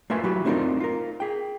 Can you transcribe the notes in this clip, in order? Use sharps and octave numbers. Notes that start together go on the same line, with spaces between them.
A3 F4 A#4 B4 E5 G#5
F#3 E4 F#4 G4
A3 C4 D4 D#4 F4 A#4
F4 A#4
G#4 G5